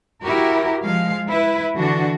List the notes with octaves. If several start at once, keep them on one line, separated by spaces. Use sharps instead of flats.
E4 F#4 G4 A#4
F3 G#3 F5
E4 B4
D3 E3 D4 F#4